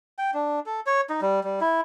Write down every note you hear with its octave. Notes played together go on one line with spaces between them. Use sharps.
G5
D4
A4
C#5
D#4
G3
G3
E4